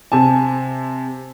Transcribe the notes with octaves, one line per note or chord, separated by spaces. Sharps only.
C3 G#5 A5